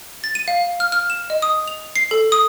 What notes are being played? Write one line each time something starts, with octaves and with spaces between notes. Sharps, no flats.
A6
D#7
F5
F6
F6
E7
D#5
D#6
F7
C7
A4
D#6